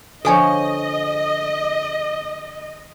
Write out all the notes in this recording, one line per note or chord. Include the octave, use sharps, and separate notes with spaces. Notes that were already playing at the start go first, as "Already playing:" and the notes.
D3 F3 A4 C#5 D#5 G#5